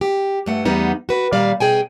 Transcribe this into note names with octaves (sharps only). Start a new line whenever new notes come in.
G4
G2 A3 F#5
E2 G3 B3 D#4 F#5
F#4 B4
A#2 D#3 G3 D5 F5
B2 G#4 G5 G#5